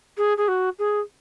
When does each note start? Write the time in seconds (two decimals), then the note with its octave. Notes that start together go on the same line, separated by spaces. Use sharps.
0.17 G#4
0.37 G#4
0.48 F#4
0.78 G#4